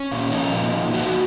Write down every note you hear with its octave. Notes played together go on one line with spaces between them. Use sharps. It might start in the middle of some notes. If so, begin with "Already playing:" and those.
Already playing: C#4
A#2
F3 D#4
A#2
A#2
F3 F#4